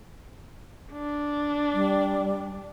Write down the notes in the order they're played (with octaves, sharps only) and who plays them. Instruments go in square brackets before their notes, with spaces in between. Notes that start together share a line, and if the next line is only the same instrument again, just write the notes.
[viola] D4
[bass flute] G3